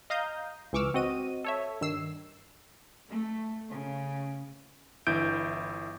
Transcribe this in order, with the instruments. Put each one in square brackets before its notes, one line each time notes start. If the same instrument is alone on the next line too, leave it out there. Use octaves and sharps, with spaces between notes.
[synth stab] D#5 F5 A#5 D#6 G6
C#2 E3 C#6 D6 E6 F6
C4 F#4 D#5 D#7
A4 C#5 E5
G2 D#3 E6 C7
[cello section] A3
C#3
[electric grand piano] G1 E3 E4 G6 D7